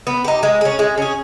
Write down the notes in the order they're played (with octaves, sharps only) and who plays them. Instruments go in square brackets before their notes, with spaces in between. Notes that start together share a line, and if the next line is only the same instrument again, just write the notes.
[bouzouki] B3
D#4 G4
G#3
C#4 G#4
G#3
C#4 G#4